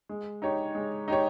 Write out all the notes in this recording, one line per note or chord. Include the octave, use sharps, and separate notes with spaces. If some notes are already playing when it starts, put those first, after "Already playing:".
G#3
D#4 G4 C#5
G#3
D#4 G4 C#5